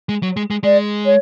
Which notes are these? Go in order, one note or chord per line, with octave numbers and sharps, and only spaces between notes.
G#3
F#3
G#3
G#3
G#3 D5
C#5